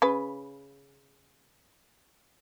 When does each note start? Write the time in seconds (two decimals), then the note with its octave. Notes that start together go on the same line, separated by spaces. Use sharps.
0.02 C#3 B4